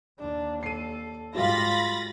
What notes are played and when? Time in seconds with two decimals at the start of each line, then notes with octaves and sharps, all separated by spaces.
0.20 D#2 D4
0.63 A4 C7 D#7
1.35 G#2 G3 F4 F#4 F5 B5 A6 A#6